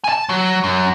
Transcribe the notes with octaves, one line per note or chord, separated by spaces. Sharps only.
G#5 A5
F#3
F#2